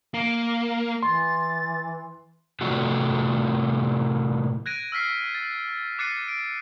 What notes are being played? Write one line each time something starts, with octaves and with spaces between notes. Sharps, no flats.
A#3
E3 C6 A6
A2 C3 E3 A3 F4 F#4
F#6 G#6 A#6 D7 D#7
E6 F6 B6 C7
A6
D6 F#6 A6 C7 C#7 D#7
D7